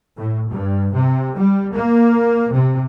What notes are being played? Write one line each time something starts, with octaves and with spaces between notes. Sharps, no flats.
A2
G2
C3
G3
A#3
C3